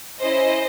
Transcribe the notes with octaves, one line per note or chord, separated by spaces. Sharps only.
C#4 E4 G#4 C5 D#5